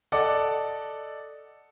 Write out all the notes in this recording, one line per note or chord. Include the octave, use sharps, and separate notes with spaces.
A4 D5 D#5 F#5 D6